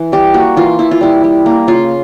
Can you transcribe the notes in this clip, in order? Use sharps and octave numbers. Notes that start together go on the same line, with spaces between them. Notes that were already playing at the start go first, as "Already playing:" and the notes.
Already playing: E3
G3 G4
A#3 F#4
E3 F4
E3 E4
F4
G3 E4
G3
A#3
C#3 F4